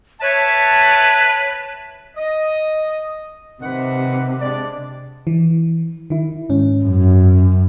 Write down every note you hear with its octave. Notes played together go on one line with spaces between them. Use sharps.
B4 C#5 E5 A5
D#5
C3 D#3 B4 F#5
G#3 D4 D5
E3
D#3 E4
G#2 C#4
F#2